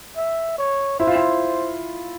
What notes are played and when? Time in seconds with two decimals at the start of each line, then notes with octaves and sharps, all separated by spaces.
0.16 E5
0.58 C#5
0.99 E4 C5
1.07 F4
1.15 E4